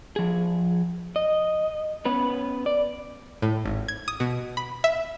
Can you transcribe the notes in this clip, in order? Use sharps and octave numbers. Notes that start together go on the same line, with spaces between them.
F3 G#4
D#5
B3 C#4 B4
D5
A2
G#1
G#6
D#6
B2
B5
E5